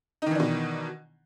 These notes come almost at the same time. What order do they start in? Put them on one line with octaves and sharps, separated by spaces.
D#4 D#3 E3 D4 B2